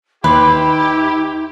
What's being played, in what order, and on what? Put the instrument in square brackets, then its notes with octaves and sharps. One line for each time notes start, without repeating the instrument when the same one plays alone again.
[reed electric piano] D#2 C6 [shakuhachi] D#4 [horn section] E4 G4 [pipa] B4